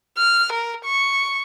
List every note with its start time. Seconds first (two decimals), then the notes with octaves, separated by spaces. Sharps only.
0.18 F6
0.52 A#4
0.86 C#6